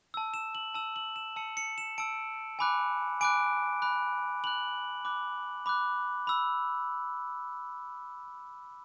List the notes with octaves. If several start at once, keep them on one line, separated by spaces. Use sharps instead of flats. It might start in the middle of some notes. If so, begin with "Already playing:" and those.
A5 E6
E7
F#7
A5 E6 E7
F#7
E7
A5 E6 C#7
C#7
E7
A5 E6 D7
G#5 B5 D6 F#6
G#5 B5 D6 F#6 D7
B5 F#6
B5 F#6 F#7
B5 D6 F#6
B5 D6 F#6
B5 E6